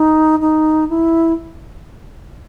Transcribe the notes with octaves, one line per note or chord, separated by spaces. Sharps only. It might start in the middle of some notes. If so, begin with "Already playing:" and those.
Already playing: D#4
D#4
E4